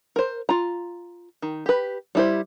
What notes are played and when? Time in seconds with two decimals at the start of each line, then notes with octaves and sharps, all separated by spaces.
0.16 A#4 C5
0.49 F4 A#5
1.42 D#3
1.66 G4 B4
2.15 G3 E4 C5